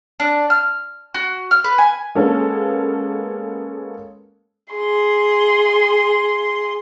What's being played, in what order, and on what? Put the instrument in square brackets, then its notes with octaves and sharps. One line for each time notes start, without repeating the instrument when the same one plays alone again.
[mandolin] D4
F6
F#4
F6
B4
G#5
[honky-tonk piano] G#3 A#3 B3 C#4 A4
[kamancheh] G#4 C6